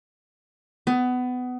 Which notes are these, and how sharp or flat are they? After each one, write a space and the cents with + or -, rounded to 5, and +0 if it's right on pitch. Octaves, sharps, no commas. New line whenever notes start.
B3 +20